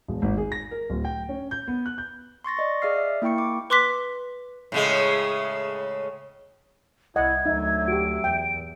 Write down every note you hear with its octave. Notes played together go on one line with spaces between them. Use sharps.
E1
G#1
G#4
A#6
A#4
D1
G5
C#4
G6
B3
F#6
G6
C6 C#6 A6 A#6
D5 D#5 C#6
G#4 D5 D#5 F5 F6 C7
E5
A#3 E4 G5 C#6 C#7
D6
B4 C6 D6 F#6 B6
A2 C#3 G#3
C2 E4 D#5 F#5 G#6
D2 F#3 D#4 E5
F#4 G4 D7
E2 G5